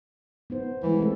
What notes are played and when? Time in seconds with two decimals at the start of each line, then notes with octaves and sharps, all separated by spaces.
0.50 B3 D#4 C5
0.83 E3 G3 G#3
0.99 A3 C4 A4